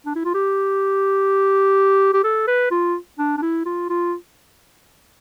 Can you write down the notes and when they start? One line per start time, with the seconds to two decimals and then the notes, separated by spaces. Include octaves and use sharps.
0.06 D4
0.15 E4
0.25 F4
0.34 G4
2.14 G4
2.24 A4
2.47 B4
2.71 F4
3.19 D4
3.38 D4
3.42 E4
3.66 F4
3.89 F4